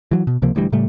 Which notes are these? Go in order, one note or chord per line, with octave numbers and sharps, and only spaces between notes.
E3 F#3
B2
C#2 C3 F3 A#3
D1 D2 E3 G3
A2 C#3 G3 A3